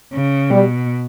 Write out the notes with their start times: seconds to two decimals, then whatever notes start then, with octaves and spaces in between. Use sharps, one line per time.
0.13 C#3
0.51 B2 G3